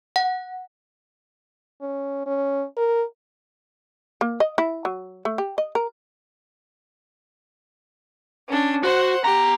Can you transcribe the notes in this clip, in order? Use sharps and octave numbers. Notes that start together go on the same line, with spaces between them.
F#5
C#4
C#4
A#4
A#3
D#5
E4
F#3
A3
G4
D#5
A#4
C#4 D4
F#4 C5 F#5
B3 G4 A#5